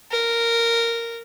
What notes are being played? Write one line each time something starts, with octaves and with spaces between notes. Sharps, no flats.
A#4